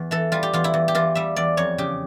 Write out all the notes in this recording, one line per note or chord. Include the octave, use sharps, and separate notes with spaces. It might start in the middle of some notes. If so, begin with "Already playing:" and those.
Already playing: E2
E3 A4
G3 F4
G4
E2 F4
E4
E2
G4
E3 F4
G3 E5
E2 D5
F2 C#5
C#3 G4